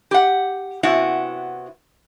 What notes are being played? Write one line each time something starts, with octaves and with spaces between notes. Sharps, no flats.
G4 F#5
C3 B3 C#4 E4 F#4